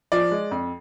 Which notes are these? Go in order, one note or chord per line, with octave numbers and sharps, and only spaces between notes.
F3 D5
G#3
F2